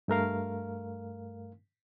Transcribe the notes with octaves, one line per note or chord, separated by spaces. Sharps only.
G2 A3 A#4 F5